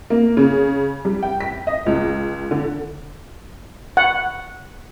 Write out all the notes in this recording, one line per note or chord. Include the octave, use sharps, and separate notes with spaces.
A#3
C#3
G3
G5
B6
D#5
C#2
D3
F#5